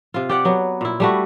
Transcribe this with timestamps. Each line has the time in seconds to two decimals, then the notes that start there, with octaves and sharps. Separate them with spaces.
0.14 C3 F4
0.29 G4 D5 F#5
0.45 F#3 B3
0.81 A#2 E4
1.00 G3 A3 F#4